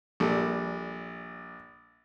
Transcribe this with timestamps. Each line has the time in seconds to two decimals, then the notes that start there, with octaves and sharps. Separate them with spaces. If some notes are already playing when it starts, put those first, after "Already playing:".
0.20 A#1 G3 A4